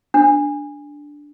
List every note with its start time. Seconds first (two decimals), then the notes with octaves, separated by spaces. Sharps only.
0.14 D4